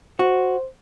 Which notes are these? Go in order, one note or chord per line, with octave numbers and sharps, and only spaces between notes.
F#4 C5